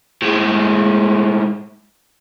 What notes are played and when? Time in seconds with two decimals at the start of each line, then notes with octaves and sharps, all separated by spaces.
0.22 A2 G#3